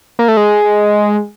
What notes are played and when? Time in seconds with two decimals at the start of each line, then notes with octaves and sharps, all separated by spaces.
0.19 A#3
0.28 A3
0.37 G#3